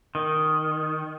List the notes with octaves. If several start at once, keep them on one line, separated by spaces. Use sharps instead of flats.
D#3